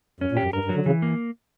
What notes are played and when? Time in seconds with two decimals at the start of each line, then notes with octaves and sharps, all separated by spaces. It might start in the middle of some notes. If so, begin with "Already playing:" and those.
0.20 F#2 C#4
0.32 A#2
0.37 G4
0.42 F#2
0.53 G2 A#4
0.65 G2
0.69 F#3
0.75 D3
0.86 C#3 E3
1.02 A#3